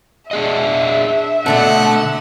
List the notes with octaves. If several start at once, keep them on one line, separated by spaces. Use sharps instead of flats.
D4 G#4 D#5 E5
B2 D3 A3 C4 F#5 A5